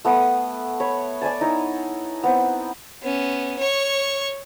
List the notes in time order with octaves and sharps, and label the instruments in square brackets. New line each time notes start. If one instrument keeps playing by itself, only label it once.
[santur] A3 B3 B5 D#6
C#5 B5
D5 E5 G#5 A5
D#4 E4 C#5
B3 C4
[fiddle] B3 C#4
C#5 C#6